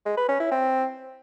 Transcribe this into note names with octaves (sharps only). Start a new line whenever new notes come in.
G#3
B4
C#4
E4
C4